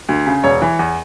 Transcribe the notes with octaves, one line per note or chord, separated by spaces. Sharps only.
D2
C#3
E1 C#5
E3
E2